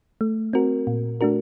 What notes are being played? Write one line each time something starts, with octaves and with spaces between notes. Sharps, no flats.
A3
C4 F#4 A#4
A#2
A3 D4 F#4 A#4